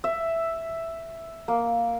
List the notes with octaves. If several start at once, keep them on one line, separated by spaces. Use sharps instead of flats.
E5
A#3